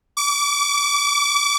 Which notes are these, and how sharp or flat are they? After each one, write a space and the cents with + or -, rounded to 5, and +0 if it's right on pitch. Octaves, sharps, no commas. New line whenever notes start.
D6 -35